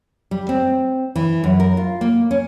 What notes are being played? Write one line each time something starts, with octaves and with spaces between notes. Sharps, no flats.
G3
C4
E3
F#2
A#4
F4
A#3
C#4